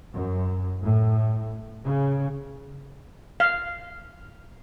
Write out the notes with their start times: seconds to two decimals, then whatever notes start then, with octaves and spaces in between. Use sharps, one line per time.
0.14 F#2
0.82 A2
1.86 C#3
3.40 F5